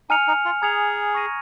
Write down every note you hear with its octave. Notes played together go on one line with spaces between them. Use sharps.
D#4 G#5 F6 C#7 F7
D#4
F4
G#4 A#5 D#6 G#6 C#7 F7
C#6 A#6 D#7